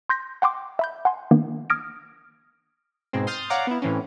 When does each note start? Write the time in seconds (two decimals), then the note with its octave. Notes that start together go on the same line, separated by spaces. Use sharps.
0.09 C6 G6 A#6 B6
0.42 F#5 G5 C6 D6
0.79 E5 B5 G6
1.05 F#5 G#5 C6
1.31 D#3 A#3 B3 D4
1.70 D#6 F6 G#6 A#6 D7
3.13 G#2 B2 G#3 C4
3.27 C6 D#6 F6 G6 A6
3.50 C#5 D5 F5 F#5 A#5 D6
3.67 B3 E4
3.82 A2 E3 C4 C#4